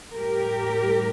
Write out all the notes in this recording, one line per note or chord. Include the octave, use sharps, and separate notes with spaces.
A2 G3 G4 A#4